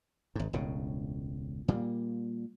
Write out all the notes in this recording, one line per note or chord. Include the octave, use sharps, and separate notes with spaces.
G#1 G#2
E1 C#2 A2 C#3
A#2 G3 A#3